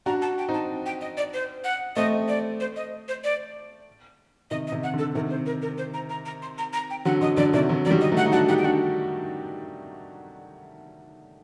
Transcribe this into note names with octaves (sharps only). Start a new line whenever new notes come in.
D4 F#4 A#5
A5
G5
C4 D#4
A5
G5
D#5
D5
C5
F#5
A3 C4 D#5
D5
C5
D#5
C5
D5
C3 D#3 D#5
D#5
C3 D#3
F#5
D3 A4
C3 D#3 A#4
C5
A#4
A#4
C5
A#5
A#5
A#5
C6
A#5
A#5
G5
D3 F#3 F#5
D3 D#5
D3 F#3 D5
C3 D#3 D5
D3 F#3
F#3 D5
D#3 G3
D#5
F#3 A3
F#5
D#4
D4 F#4 F#5
D#4 G4 F#5
G5
D4 F#4 F#5